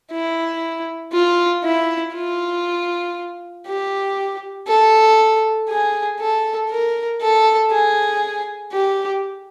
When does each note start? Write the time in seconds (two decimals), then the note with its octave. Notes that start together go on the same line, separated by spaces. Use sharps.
0.11 E4
1.13 F4
1.64 E4
2.14 F4
3.67 G4
4.67 A4
5.69 G#4
6.20 A4
6.70 A#4
7.21 A4
7.71 G#4
8.72 G4